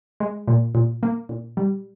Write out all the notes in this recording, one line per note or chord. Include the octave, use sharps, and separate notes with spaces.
G#3
A#2
A#2
A#3
A#2
G3